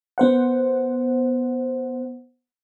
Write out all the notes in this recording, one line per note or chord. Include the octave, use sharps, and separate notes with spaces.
B3 C5 F#5